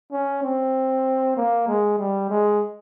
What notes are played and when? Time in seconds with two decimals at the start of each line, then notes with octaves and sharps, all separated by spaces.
0.12 C#4
0.43 C4
1.37 A#3
1.67 G#3
1.99 G3
2.30 G#3